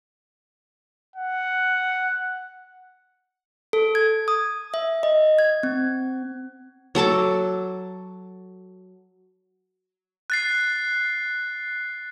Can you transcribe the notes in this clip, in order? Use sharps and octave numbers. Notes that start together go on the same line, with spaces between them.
F#5
A4
G#6
D#6
E5
D#5
G#6
C4
F#3 A4 A5 D6
F#6 A6 C7